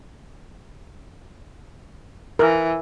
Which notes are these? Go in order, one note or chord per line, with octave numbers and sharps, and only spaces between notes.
E3 A#4